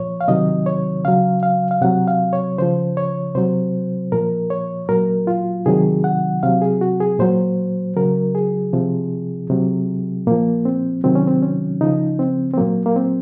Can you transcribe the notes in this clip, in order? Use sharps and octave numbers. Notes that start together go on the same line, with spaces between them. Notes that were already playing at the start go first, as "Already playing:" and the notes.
Already playing: A#2 F3 C#5
F5
C3 D#3 F#3 D#5
C#5
C#3 F#3 F5
F5
F5
C3 F#3 F#5
F5
C#5
C#3 F3 C5
C#5
C3 F#3 C5
A#2 F3 A#4
C#5
A#2 F#3 A#4
F4
C3 D#3 F#3 G#4
F#5
C3 F#3 F5
G#4
F#4
G#4
A#2 F#3 C5
C#3 F#3 A#4
G#4
C3 F3
C3 F#3
A#2 F3 A#3
C4
C3 D#3 F#3 C4
C#4
C4
C#4
C#3 F3 D#4
C4
C4
A#2 F#3 A#3
A#3
C4